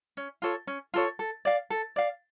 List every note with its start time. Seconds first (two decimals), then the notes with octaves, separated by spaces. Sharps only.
0.17 C#4
0.42 F4 A4 C#5
0.67 C#4
0.94 F4 A4 C#5
1.19 A4
1.45 D5 F5
1.70 A4
1.96 D5 F5